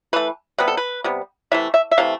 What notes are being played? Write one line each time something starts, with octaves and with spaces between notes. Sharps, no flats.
E3 A3 B4
C3 G3 B3 B4
A4
B4
C3 G3 B3
C3 E3 A3 E5
E5
E5
C3 E3 A3 F5